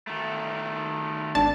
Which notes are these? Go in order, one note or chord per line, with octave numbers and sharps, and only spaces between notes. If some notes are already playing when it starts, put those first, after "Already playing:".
D#3 A3
G#1 D4 A5